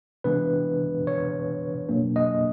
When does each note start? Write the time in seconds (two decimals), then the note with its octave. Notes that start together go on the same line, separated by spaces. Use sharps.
0.24 C3 E3 G#3 B3 D4 B4
1.07 C#5
1.88 B2 F#3 A#3 D4
2.16 D#5